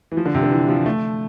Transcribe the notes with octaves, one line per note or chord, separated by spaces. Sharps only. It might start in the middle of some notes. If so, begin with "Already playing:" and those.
E3
F3
D3
C3
D3
E3
F3
A3